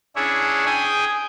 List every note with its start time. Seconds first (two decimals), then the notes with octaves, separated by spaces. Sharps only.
0.16 C#4 D4 E4 G#4 C#5
0.66 G#4 G5 G#5 D#6